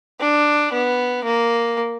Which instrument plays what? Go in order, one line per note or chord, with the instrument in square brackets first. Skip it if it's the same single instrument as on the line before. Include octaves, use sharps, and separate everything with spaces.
[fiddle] D4
B3
A#3